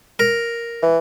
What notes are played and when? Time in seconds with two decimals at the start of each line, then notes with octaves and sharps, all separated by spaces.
0.19 A#4
0.83 E3